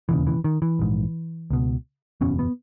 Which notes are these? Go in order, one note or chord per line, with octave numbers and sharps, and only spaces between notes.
E1 D#2 C#3 E3
E3
D#3
E3
A#1 G#2
C#2 B2
F#1 E2 B2 C#4
B3